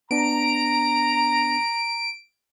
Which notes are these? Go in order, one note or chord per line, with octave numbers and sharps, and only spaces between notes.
B3 D4 A#5 D7